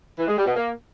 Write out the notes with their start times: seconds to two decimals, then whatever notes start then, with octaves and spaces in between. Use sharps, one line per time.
0.19 E3
0.28 G#3
0.37 G3
0.46 B2
0.55 A#3